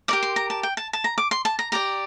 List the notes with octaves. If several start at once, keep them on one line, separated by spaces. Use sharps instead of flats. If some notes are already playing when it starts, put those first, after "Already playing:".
G4 A#4 D5 D6
C6
A#5
A5
G5
A5
A5
A#5
D6
C6
A5
A#5
G4 D5 A#5